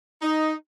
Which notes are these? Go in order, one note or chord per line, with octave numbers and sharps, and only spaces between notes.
D#4